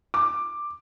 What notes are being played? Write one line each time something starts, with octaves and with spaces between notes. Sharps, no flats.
D6